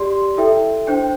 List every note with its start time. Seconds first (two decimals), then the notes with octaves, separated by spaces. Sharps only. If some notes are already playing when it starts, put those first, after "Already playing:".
Already playing: G4 D5 C6
0.37 E4 A4 E5 G5
0.87 D4 C5 G5